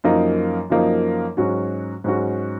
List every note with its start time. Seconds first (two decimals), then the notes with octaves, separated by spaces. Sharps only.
0.04 F#2 F3 A#3 D#4
0.70 F#2 F3 A#3 D#4
1.37 G#2 F#3 C#4 F#4
2.04 G#2 F#3 C#4 F#4